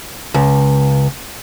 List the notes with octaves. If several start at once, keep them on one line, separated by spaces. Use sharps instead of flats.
C#2